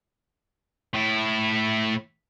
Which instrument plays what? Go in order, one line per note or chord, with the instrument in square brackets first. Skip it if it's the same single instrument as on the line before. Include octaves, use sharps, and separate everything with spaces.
[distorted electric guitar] A2 E4